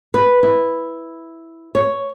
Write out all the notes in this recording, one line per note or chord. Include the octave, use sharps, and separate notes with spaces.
B4
E4
C#5